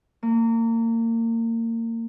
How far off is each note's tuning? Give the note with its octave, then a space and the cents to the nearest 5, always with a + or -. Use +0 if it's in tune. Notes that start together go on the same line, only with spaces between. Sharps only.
A#3 -30